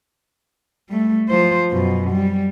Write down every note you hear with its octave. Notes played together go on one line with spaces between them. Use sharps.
G3 A3
F3 C5
F#2 B2
G3